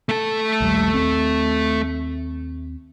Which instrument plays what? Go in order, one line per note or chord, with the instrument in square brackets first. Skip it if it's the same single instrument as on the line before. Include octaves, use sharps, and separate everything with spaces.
[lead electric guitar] A3 A4
[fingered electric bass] A#1 D#2 G3
D#2 C4